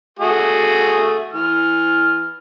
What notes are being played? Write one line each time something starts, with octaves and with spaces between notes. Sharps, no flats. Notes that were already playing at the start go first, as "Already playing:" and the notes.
A3 F#4 G#4
E3 F6